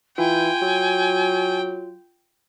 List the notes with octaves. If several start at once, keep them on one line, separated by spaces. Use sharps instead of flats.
E3 F4 G5 G#5
F#3